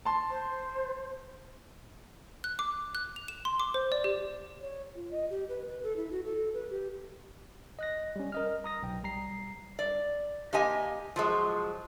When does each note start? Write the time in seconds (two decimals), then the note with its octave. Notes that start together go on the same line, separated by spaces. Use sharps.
0.05 A5 C6
0.30 C5
2.44 F#6
2.59 D6
2.95 F#6
3.16 F7
3.28 E7
3.45 C6
3.60 D6
3.74 C5
3.92 D5
4.04 G4
4.61 C#5
4.95 F4
5.11 D#5
5.30 G4
5.49 B4
5.68 B4
5.83 A4
5.96 E4
6.11 F#4
6.25 A4
6.53 B4
6.70 G4
7.79 D#5 F#6 A#6
8.16 G3 C#4
8.32 A#4 D#5 F6
8.64 A#5 D#6 A#6
8.83 B1 G5
9.04 G3 A#5 C7
9.79 D5
10.53 A#3 G4 D#5 G#5
11.16 F3 F#3 G#3